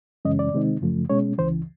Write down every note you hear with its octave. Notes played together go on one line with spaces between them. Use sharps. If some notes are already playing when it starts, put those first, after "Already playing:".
F#2 C#3 E3 G#3 C#4 D#5
D5
C3 D#3 G#3 C4 D#4
F#2 C#3 F3 A3
B2 G#3 C#4 C#5
C#2 C#3 E3 C5